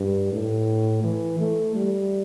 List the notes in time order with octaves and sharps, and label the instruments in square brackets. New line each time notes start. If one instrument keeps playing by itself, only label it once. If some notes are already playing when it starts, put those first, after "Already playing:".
Already playing: [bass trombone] G2
A2
E3
A3
G3